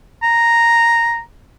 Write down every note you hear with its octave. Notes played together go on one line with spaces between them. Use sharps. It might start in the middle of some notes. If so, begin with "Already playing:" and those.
A#5